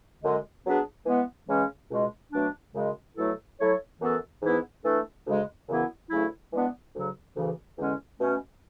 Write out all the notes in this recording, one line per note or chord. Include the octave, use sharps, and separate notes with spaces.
F#2 D3 G#3
F#3 B3 D4 G#4 B4
E3 G#3 B3
C#3 E3 G#3 C#4
C#2 B2 G#3
B2 F#3 A3 D4
F#2 C#3 G#3
B2 F#3 A3 E4 A4
F#3 A3 E4 A4 C#5
F#2 E3 B3 F#4 A4
G#2 E3 B3 E4 B4
E3 A3 D4 A4
D2 C#3 G#3
F#2 C#3 E3 B3 E4
D2 C#3 F#3 A3 E4
E3 G#3 B3 D4
D2 C#3 F#3
D2 C#3 E3
E2 D3 G#3 C#4
B2 A3 C#4